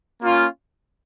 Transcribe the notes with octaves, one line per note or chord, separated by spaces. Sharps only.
A#3 C#4 F4